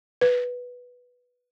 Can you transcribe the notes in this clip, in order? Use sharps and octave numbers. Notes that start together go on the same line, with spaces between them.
B4